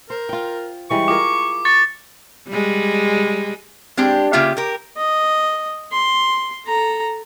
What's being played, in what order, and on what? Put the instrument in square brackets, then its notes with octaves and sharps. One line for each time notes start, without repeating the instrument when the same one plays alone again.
[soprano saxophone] A#4 [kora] C5
[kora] F4 G5
[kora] E3 G3 G#3 [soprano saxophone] C#6
[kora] F4 G#4 A#4 [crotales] D6
[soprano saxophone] C#6 [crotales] A6
[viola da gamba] G3 G#3
[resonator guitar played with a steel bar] G#3 C4 D4 G4
C#3 A#3 F4 G4 E5
G4 A#4
[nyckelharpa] D#5
C6
A4 A#5